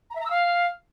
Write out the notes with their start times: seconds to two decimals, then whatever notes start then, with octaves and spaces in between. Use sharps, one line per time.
0.10 A#5
0.15 E5
0.20 A#5
0.25 E6
0.30 F5